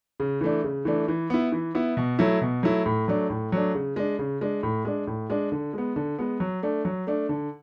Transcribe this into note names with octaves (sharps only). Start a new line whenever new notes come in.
C#3
E3 A3 D4
C#3
E3 A3 D4
E3
B3 E4
E3
B3 E4
B2
F#3 A3 E4
B2
F#3 A3 E4
A2
F#3 A3 D4
A2
F#3 A3 D4
C#3
G#3 D4
C#3
G#3 D4
A2
G#3 D4
A2
G#3 D4
D3
G#3 B3
D3
G#3 B3
F#3
A3 D4
F#3
A3 D4
D3